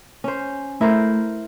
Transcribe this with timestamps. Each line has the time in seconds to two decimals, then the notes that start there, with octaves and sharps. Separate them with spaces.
0.24 C#4 C5
0.81 A3 E4 A#4 C5